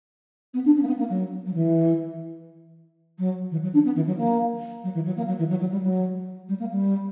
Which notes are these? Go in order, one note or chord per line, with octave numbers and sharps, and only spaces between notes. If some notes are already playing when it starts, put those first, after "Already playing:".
B3
D4
C#4
A#3
B3
A#3
F#3
F#3
E3
F#3
E3
F#3
D4
B3
E3
F#3
A#3
F#3
E3
F#3
A#3
F#3
E3
F#3
F#3
G3
F#3
G3
A#3
G3